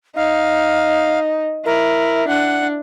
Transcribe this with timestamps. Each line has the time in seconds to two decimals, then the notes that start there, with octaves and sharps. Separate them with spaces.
0.16 D#4 F5
1.66 E4 A#4
2.28 D4 F#5